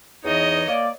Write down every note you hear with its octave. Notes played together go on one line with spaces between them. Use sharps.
E2 E3 D#4 C#5 D#5
A#3 D5